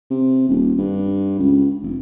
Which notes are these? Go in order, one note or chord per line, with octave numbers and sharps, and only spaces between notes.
C3
D#1
G2
C#2
F1